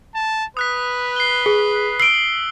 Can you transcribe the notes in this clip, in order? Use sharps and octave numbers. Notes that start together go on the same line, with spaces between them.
A5
B4 D#6 F#6 B6
C7 G7
G#4
E6 C7 D7 G7